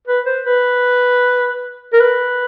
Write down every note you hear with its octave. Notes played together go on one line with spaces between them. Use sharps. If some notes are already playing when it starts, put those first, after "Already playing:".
B4
C5
B4
A#4
B4